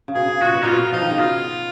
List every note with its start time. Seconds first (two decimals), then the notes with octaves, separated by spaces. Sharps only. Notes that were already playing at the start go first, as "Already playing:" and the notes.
0.08 C#3
0.15 B2 G#4
0.28 C#3
0.41 A#2 F#4
0.54 B2
0.63 A#2 D#4 F4
0.72 B2
0.92 F3 D#4
1.02 D#3
1.11 C#3
1.19 B2 F4